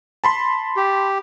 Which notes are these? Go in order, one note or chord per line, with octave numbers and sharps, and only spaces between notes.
A5 B5 C6
G4